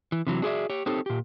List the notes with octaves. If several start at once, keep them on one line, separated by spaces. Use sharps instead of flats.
E3
C3 E3 F#3
D4 F#4 G#4 A#4 D5 E5
G4 C#5
C4 D#4 G4 A4 C5 C#5
A#2 G4